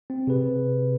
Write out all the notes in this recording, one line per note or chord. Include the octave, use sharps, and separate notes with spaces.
C4
C3 G#4 B4